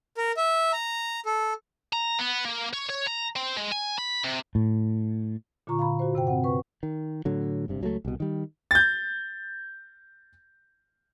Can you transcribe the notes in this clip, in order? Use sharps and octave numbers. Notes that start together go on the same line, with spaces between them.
A#4
E5
A#5
A4
A#5
B3
A#3
C#5
C#5
A#5
C4
G#3
G#5
B5
C3
A2
A#2 D3 F4 A#5 C#6
F5 A#5 B5
F#4 C5
G2 C3 C5 G5
C4 F#5
B4 C#6
D#3
A2 D3 F#3
F#1 G2 C3
C#2 F#3 G#3 A3
C2 B2
D#3 G3
G6 A6